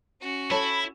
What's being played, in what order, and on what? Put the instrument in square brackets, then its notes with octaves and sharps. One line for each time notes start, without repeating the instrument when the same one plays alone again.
[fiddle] C#4 F#4
[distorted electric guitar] E4 [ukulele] A4 C#5 [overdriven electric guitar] B5